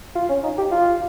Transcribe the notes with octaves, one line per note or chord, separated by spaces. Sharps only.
F4
C#4
D#4
G4
F4